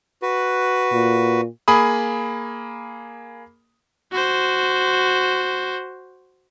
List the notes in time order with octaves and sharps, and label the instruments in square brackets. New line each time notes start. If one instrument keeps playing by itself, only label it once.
[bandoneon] F#4 B4
[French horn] A#2
[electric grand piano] A#3 G#4 B5 D#6
[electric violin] F#4 C5